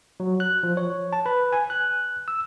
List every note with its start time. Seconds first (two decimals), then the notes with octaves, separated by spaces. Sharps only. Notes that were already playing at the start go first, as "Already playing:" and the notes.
0.20 F#3
0.40 F#6
0.63 F3
0.77 C#5
1.13 A5
1.26 B4
1.53 G#5
1.70 F#6
2.28 E6